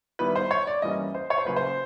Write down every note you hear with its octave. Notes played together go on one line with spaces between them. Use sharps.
D#3 G3 B3 E4 B4
C5
C#5
D5
G2 E3 G3 A#3 C#4 D#5
C5
C#5
C5
C#3 F#3 A#3 B4
C5